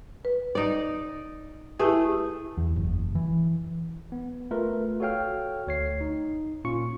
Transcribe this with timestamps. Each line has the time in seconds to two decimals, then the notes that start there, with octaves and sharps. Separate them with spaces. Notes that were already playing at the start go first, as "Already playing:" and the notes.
0.25 B4
0.55 D#4 D5
1.79 A3 E4 G4 G#4 B4
2.58 E2
2.76 F#1
3.15 E3
4.12 B3
4.51 A3 F4 A#4 B4
5.00 F#4 A4 C#5 F5 G5 F6
5.67 D2 C#5 C7
6.01 D#4
6.65 A#2 C#4 F4 C#6 C#7